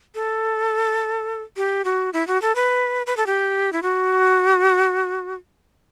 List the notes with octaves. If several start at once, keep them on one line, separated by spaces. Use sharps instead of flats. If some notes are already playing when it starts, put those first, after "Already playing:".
A4
G4
F#4
E4
F#4
A4
B4
B4
A4
G4
E4
F#4